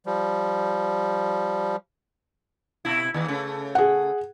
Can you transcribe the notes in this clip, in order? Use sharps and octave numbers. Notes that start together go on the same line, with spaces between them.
F3 G3
B2 E4
D#2 E3
C#3 A3
G#4 F#5